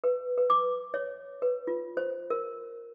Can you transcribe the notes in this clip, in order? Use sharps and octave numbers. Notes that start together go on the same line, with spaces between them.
B4
B4
D6
C#5
B4
F4
C5
A#4